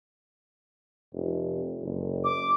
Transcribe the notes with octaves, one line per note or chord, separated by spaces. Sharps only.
F1
F#1
D6